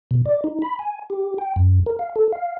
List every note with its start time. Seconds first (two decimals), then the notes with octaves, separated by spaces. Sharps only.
0.11 B2
0.26 D5
0.44 D#4
0.62 B5
0.79 G#5
1.10 G4
1.38 G5
1.56 F#2
1.86 A#4
1.99 F5
2.16 A4
2.33 F5